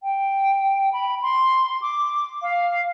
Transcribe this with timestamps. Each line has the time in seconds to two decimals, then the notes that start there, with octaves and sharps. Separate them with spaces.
0.03 G5
0.93 B5
1.22 C6
1.82 D6
2.42 F5